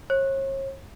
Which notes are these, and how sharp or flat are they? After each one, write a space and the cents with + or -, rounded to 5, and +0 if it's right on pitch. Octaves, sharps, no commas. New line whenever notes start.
C#5 -40